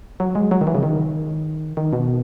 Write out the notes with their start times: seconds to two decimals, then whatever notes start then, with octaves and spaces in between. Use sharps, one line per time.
0.20 F#3
0.35 G#3
0.51 F#3
0.61 D#3
0.67 E3
0.75 C#3
0.83 D#3
1.77 D#3
1.93 B2